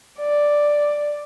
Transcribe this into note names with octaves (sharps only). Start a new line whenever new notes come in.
D5